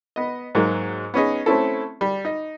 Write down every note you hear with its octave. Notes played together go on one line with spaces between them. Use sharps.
B3 D#5
G#2 F#3 G#3 A#3
B3 C#4 D#4 G#4
A3 C4 C#4 E4 A4
G3
D#4